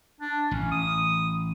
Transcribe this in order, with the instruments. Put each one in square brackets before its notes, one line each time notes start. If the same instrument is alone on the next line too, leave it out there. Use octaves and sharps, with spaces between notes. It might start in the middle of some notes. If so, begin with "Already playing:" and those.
[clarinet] D4
[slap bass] A1 [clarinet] C#4
[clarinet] D#6